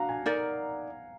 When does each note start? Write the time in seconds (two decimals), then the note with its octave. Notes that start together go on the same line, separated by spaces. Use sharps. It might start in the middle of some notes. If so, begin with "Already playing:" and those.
Already playing: D4 F#4 F5 F#5 A#5
0.09 G#5
0.26 D#4 A#4 D5